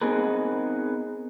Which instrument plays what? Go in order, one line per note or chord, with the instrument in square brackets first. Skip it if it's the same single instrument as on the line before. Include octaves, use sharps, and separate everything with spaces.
[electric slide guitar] B3 C4 D#4 G#4 A#4 B4